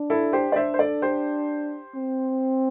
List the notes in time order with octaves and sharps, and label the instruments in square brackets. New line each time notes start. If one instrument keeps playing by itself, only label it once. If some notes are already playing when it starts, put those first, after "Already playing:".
Already playing: [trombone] D4
[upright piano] E4 A4
G4 C5
D5
[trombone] D4 [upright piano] C5 E5
[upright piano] C5
A4 D5
G4 C5
[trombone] C4